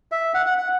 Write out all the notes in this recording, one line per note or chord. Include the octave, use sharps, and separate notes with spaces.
E5
F#5
F#5
F#5